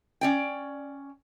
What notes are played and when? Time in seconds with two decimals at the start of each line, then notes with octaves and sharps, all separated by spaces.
0.21 C#4 D5 G5